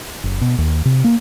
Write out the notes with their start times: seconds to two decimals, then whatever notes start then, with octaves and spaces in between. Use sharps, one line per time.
0.24 F#1
0.41 B2
0.58 D#2
0.85 C3
1.04 A#3